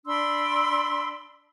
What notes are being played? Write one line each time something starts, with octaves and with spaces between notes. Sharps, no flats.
D4 B5 C6 E6